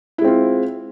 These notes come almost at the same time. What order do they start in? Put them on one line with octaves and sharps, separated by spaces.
E4 G#3 C4 F4